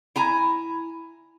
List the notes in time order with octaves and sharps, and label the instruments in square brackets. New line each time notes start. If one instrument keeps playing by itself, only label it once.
[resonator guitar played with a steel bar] E4 G#5 A#5